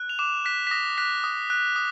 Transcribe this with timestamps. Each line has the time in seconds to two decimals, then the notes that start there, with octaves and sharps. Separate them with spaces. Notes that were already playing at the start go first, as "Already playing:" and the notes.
Already playing: F#6
0.09 F7
0.19 D6 E7
0.45 F#6 B6
0.67 B6
0.71 D#6 A#6
0.98 F#6 B6
1.24 D#6
1.50 F#6
1.76 D#6